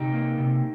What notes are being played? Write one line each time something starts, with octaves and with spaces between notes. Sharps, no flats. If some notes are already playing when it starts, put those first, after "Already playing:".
Already playing: C3 D#4 G4
A#3
C3